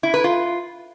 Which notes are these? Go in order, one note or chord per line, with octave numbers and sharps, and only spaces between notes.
E4
B4
F4